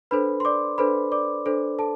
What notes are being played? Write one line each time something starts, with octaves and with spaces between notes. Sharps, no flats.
D4 A4 B4 C5 B5
C6
D5 D6
D4 A4 B4 C5 B5
D5 D6
D4 A4 C5
A4 A5